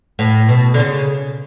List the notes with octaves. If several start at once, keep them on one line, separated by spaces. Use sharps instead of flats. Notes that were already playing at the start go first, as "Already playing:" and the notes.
A2
B2
D3
C#3